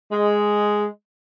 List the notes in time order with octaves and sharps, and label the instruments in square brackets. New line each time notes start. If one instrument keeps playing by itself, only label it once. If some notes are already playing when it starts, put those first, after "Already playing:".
[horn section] G#3